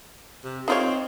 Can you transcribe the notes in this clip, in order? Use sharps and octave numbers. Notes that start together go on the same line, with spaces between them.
C3
C4 D#4 F4 C#5